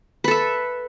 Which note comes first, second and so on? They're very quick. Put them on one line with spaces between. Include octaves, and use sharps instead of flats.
B4 A4 E5